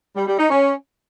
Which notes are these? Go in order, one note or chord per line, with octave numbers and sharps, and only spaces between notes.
G3
G3
D#4
C#4